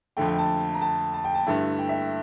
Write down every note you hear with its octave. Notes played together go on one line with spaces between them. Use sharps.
F2 D3 A3 G5
G5
A5
A#5
A5
A5
G5
A5
G2 D3 A3 E4
G5
E5